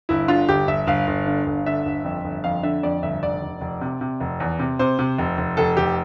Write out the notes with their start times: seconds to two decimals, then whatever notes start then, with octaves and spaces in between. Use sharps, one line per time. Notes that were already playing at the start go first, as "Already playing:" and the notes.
0.09 G1 E4
0.28 D3 F4
0.49 G1 G4
0.67 G1 E5
0.87 G1 F5
1.07 G1
1.26 D3
1.46 G1
1.66 D3 E5
1.86 G1
2.05 F2
2.24 G1
2.44 F2 F5
2.63 D3 E5
2.83 F2 D5
3.03 G1 E5
3.22 F1 D5
3.42 F1
3.61 F1
3.81 C3
4.01 C3
4.20 F1
4.40 E2
4.59 C3
4.79 C3 C5
4.99 C3
5.18 F1
5.37 F1
5.57 F1 A4
5.77 F1 G4